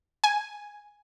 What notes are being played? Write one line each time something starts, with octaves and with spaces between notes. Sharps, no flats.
G#5